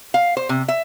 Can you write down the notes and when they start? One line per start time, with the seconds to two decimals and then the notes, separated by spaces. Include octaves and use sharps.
0.14 F5
0.37 C5
0.49 C3
0.68 E5